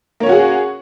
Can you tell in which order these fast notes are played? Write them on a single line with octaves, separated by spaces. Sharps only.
A#3 C#5 C#4 F#4 G#4